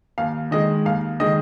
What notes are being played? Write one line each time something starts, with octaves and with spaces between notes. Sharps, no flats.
D#2 F5
D#3 G#3 D#5
D#2 F5
D#3 G#3 D#5